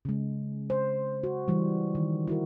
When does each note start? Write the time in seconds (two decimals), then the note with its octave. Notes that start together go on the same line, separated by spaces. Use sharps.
0.05 C#3 G#3
0.70 C5
1.23 F#4
1.48 E3 G3
1.95 D#3
2.27 E4 F#4 A#4